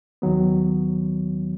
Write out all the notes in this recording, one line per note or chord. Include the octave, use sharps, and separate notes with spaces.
D#2 D#3 F#3 B3